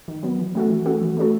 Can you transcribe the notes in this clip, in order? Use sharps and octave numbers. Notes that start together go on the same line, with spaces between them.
D#3
F#3 B3
E3
A3 C#4 F#4 A4
E3
A3 C#4 F#4 A4
E3
A3 C#4 F#4 A4